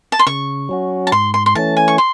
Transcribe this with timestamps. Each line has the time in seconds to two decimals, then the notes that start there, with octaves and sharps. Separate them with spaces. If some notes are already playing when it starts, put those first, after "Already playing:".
0.12 A5
0.19 C6
0.27 C#3 C#6
0.69 F#3 C#4 F#4
1.07 A5
1.12 G#2 C6
1.34 C6
1.46 C6
1.55 E3 A3 C#4 A5
1.77 G#5
1.88 C#6
1.98 C6